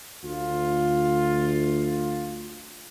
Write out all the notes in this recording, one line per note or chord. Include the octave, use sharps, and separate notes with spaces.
D2 F4